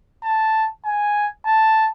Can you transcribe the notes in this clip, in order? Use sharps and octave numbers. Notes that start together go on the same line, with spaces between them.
A5
G#5
A5